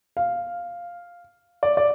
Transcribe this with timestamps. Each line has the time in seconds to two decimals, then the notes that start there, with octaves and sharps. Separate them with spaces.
0.17 F5
1.63 D5
1.77 D5